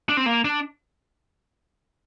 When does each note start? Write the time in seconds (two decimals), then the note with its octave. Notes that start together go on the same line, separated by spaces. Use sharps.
0.09 D4
0.17 C4
0.26 A#3
0.44 D4